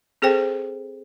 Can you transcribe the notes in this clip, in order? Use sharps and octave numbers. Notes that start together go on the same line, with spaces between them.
C4 G#4 A4 C5 G5